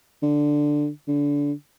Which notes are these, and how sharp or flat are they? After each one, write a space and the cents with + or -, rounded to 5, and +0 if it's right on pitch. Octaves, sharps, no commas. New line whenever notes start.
D3 +5
D3 -25